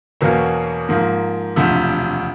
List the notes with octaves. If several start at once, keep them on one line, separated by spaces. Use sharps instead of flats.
E2 B2 F#3 A#3 C#4
G#2 F3 A#3
E1 D2 C3 F3